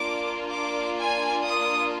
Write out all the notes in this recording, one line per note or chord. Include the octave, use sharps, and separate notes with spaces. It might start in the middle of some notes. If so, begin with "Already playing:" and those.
Already playing: A#3 D4 F4 D6
D6
G#5
D#6